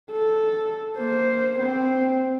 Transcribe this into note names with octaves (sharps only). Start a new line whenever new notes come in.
A4
A#3 C5
C4